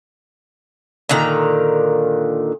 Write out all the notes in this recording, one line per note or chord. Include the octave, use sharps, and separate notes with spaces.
A#2 D3 D#3 A#5